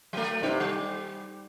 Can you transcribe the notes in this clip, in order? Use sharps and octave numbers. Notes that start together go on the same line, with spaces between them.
F#3 A3
G2 C3 D#4
G3